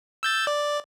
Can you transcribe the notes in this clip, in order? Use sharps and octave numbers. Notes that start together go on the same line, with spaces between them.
E6 G6 A6
D5